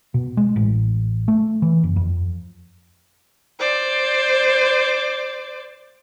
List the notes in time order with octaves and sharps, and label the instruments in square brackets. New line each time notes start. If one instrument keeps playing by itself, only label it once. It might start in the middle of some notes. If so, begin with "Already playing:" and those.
[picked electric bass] B2
G#3
A1
A3
E3
F#1
F2
[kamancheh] C5 D5